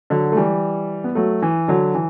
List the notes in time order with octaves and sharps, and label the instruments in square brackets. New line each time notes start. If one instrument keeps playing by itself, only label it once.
[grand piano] D3 F#3
A3
E3 G3
B3
F#3 A3
E3
D3 F#3
E3